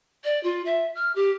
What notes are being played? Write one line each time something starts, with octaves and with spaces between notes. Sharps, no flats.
D5
F4
E5
F6
G4